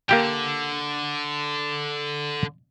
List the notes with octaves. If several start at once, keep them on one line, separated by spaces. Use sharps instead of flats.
D3 A#3 G4 G5